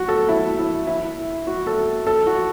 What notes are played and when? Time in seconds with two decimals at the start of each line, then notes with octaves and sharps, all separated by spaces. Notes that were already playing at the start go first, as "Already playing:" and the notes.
Already playing: F#4
0.08 A4
0.29 E4
0.58 E4
0.87 E4
1.47 F#4
1.67 A4
2.07 A4
2.27 F#4